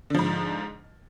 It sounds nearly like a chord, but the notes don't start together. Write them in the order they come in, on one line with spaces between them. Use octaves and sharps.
D3 F3 G#2